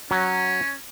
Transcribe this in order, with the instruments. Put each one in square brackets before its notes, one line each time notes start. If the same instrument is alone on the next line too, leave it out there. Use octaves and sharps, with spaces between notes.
[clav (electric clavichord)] F#3 [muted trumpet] C#4